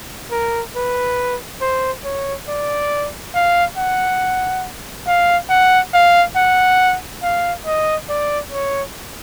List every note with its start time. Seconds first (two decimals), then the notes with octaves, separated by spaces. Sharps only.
0.31 A#4
0.76 B4
1.61 C5
2.04 C#5
2.48 D5
3.35 F5
3.77 F#5
5.07 F5
5.50 F#5
5.93 F5
6.36 F#5
7.23 F5
7.66 D#5
8.09 D5
8.52 C#5